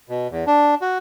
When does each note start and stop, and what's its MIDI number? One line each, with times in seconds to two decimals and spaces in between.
0.09 0.27 47
0.30 0.44 40
0.47 0.75 62
0.82 0.98 66